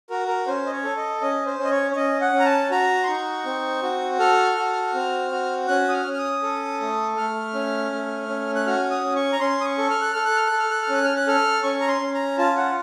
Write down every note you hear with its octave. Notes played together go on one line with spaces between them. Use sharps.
F#4 A#4
A#4
C#4 C5
D#5
C#5
A4
D#5
C#4 D#5
C5
C#4
D#5
C#5
C#5
C#4 D#5
F#5
C#4
A#5
A5
F#4 A#5
C6
D#4 C#6
C4
F#4
A4 F6
F#4
C4
F#4
C#4 F#6
D#6
F6
C#4
F6
D#6
A4
A3
A3 F6
C#4
A3
C#4
F#6
F#4 F6
D#6
C#4
C#6
A#5
C#4 C6
D#6
C#6
A4
F6
F#6
A4 F6
F#6
F6
F#6
A4
F6
F#6
F6
C#4 F#6
F6
F#6
A4 F6
C#4 C#6
A#5
C6
C#4
A#5
F4 A5
F#5